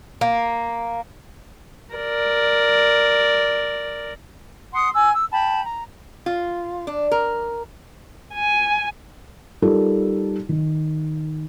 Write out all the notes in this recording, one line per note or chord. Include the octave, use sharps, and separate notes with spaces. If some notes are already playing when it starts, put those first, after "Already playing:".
A#3
A#4 D5
F#5 C6 D#6
G#5 E6
E6
G5 A5 B5
A#5
F4
D4
A#4
G#5
G3 D#4 F4 A4 A#4
D#3